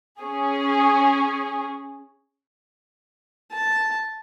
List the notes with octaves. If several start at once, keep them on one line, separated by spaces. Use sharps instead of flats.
C#4 G#4
A5